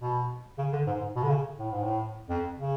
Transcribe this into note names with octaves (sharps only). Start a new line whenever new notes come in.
B2
C#3
D3
G#2
G#2
B2
D3
C#3
A2
G#2
A2
F2
C#3